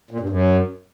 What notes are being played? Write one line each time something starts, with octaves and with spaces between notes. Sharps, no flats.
A#2
G2
F#2